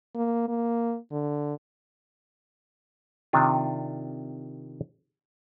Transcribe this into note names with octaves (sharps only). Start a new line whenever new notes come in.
A#3
A#3
D3
C3 D#3 D4 F4